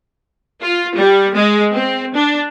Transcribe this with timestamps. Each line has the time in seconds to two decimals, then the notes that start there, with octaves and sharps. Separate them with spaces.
0.62 F4
0.95 G3
1.36 G#3
1.74 C4
2.15 D4